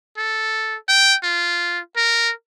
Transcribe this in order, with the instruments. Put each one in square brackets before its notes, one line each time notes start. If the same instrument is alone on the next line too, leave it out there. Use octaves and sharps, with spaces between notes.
[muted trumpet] A4
G5
F4
A#4